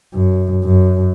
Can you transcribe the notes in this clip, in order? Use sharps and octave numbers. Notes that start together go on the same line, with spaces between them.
F#2
F#2